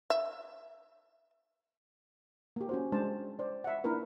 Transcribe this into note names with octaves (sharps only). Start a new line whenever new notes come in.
E5
A#3 G4
C#4 F#4 C5
G#3 D4 C5 A5
C5 D5
E5 F#5
A#3 D4 E4 A#4 B4